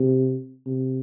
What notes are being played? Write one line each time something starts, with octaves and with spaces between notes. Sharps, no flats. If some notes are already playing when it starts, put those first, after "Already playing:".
Already playing: C3
C3